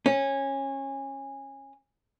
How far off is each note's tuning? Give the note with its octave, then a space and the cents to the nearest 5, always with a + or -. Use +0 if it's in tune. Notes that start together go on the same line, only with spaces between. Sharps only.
C#4 -20